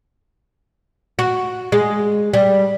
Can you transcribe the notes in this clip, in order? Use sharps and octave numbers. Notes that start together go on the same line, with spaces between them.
F#4
G#3
G3